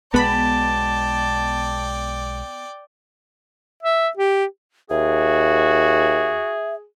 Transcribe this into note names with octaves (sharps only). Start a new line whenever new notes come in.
B1 B2 G#3 B3 D5 G5 A5 B5
E5
G4
D#2 F#4 G#4 E5